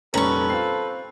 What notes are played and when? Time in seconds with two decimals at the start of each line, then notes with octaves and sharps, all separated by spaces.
0.14 F1 A#2 G3 C#4 A4 B4 A#5 C#6
0.50 C4 F4 C7